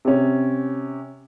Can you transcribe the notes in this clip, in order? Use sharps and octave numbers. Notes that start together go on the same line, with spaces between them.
C3 C#4